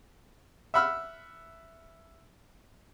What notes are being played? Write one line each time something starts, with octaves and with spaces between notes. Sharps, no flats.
E5 F#5 B5 E6 F6